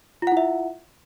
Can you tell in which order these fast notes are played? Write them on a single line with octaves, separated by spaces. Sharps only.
F4 F#5 E4 E5